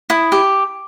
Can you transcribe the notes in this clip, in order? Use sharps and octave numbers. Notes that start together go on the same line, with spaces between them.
E4 D#6
G4